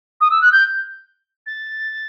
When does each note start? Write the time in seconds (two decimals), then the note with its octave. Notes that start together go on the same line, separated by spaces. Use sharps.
0.21 D#6
0.30 E6
0.41 F#6
0.52 G6
1.46 A6